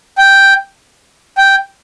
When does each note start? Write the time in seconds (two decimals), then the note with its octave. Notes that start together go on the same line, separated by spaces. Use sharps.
0.18 G5
1.37 G5